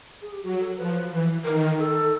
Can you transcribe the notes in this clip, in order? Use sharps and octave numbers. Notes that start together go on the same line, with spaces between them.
G#4
G4
F#3 F#4
A4
F3 B4
E3
D#3 A#4
A#4
A4